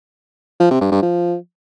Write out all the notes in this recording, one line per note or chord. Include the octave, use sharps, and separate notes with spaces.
F3
C3
G2
G2
F3